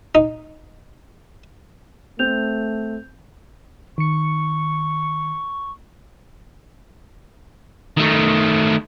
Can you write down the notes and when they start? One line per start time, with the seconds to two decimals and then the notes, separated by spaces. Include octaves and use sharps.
0.15 D#4
2.19 A3 C4 G6 F7
3.98 D#3 C#6 C#7
7.97 D#3 A3